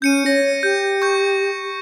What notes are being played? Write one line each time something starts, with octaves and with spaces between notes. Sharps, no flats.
C#4 G6 C#7 D#7
C#5 A#6
G4 G6
C#6 G6